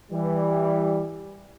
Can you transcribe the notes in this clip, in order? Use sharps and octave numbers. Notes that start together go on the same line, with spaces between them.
E3 G3